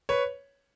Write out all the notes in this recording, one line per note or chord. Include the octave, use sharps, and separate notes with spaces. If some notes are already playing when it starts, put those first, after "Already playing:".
B4 C#5